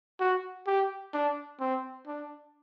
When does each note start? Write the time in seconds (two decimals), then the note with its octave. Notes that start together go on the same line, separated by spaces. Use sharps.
0.20 F#4
0.67 G4
1.14 D4
1.60 C4
2.07 D4